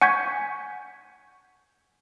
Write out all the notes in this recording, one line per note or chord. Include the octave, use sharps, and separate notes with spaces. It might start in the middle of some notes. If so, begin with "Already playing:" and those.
F#5 G#5 C#6 G6 G#6 B6